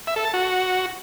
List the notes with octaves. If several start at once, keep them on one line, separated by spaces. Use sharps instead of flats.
E5
A4
A5
F#4